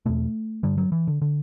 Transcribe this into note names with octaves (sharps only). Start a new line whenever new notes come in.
E2 B2 A3
G2 D3 G3
F#3
E3
D3
D3